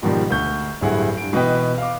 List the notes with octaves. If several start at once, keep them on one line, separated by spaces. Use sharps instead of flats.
G#2 B2 D#3 F3 G3
D2 C#6 G6
D1 G2 E4 G#4 F#5
G2 D7
B2 E3 B4 D#5 G5
F5 D6